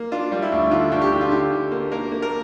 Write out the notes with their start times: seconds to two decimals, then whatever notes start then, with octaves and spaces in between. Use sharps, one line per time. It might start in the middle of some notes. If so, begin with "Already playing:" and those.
Already playing: A#3
0.12 D4 F4
0.32 G3
0.42 E4
0.52 D2
0.71 D3 F4
0.92 D2
1.02 G4
1.12 D3
1.21 F4
1.31 D3 G4
1.52 D3
1.72 A#3
1.92 A#3 A#4
2.12 A#3
2.22 A#4